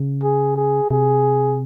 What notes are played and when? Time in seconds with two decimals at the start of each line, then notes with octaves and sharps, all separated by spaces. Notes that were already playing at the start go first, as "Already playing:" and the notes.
Already playing: C#3
0.24 G#4
0.57 G#4
0.91 C3 G#4